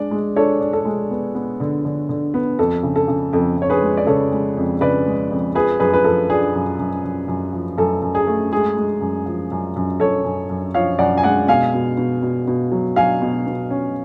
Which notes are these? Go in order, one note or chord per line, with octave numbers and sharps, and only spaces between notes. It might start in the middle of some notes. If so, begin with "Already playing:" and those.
Already playing: G#3 D4 D5
G#3
D4 A4 C#5
D4
A4
G#3
B3
B3
D3
D3
D3
B3
F2 A4
C#3
A4
C#3
F2 A4
F2 C#5
G#4 B4
G#3
D5
C#3 A4 C#5
G#3
F2
C#3 B4 D5
G#3
F2
F3 G#4 B4
F#2 G#4 B4
B4
F3 A4
D4 G#4
F#2
F#2
F#2
F#2
F3
F#2 A4
F#2
G#4
A3
G#3 G#4
G#3
F#2
F3
F#2
F#2
F#2 A4 C#5
F#2
F#2
F3 C#5 F5
F#2 D5 F#5
G#5
G#3 D5 F#5
B2 F5 G#5
B2
B2
B2
B2
F#3
F#3 F5 G#5
B2
B2
C#4